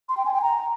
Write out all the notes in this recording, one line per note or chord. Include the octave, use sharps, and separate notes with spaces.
C6
G5
G#5
G5
A#5